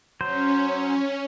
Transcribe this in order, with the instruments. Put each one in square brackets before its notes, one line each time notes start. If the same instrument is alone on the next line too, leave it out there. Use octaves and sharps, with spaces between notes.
[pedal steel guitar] F#3 C5 [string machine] C#4